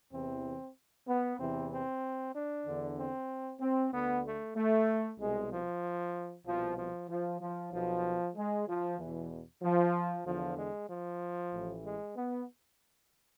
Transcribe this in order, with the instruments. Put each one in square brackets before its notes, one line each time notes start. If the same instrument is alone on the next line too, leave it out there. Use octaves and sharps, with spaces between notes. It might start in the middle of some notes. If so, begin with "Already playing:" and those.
[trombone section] E2 C3 E3 C4
B3
E2 C3 E3 C4
C4
D4
E2 D3
C4
C4
D2 D3 B3
A3
A3
C2 B2 G#3
F3
C2 B2 F3
F3
F3
F3
B1 B2 F3
G#3
F3
E2 B2 E3
F3
E2 D3 F3
G#3
F3
A1 A2 E3
G#3
B3